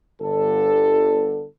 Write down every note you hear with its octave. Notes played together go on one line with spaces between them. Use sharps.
G1 D3 A4